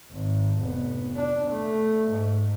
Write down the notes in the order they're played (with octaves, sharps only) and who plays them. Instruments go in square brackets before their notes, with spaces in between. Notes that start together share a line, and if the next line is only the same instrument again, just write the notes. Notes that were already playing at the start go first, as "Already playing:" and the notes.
[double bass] G#1
F1 B3
D4
A3
G#2